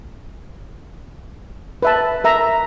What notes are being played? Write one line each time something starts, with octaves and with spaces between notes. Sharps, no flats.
B4 E5 A5
A#4 E5 A#5